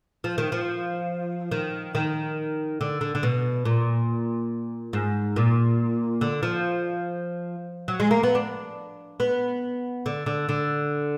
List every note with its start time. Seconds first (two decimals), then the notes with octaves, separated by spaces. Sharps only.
0.24 F3
0.38 D#3
0.52 F3
1.51 D#3
1.95 D#3
2.81 D3
3.01 D3
3.15 D3
3.23 B2
3.65 A#2
4.93 G#2
5.36 A#2
6.21 D3
6.43 F3
7.88 F#3
8.00 G#3
8.11 A#3
8.23 B3
8.35 D4
9.20 B3
10.06 D3
10.26 D3
10.49 D3